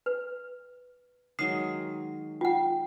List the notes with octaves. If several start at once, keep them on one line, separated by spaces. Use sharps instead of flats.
B4
D#3 F#3 G#3 D#6 C7
F4 F#5 G5